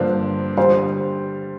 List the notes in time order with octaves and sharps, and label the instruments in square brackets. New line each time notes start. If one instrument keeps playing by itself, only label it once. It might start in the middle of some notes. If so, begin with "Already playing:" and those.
Already playing: [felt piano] G2 D3 F3 A#3 D4 [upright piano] C5
[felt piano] D3 G3 [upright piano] C5